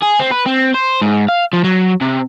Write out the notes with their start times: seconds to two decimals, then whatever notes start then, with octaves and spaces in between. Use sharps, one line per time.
0.02 G#4
0.19 C4
0.31 B4
0.46 C4
0.75 C5
1.02 G#2
1.28 F5
1.53 F3
1.64 F#3
2.01 C3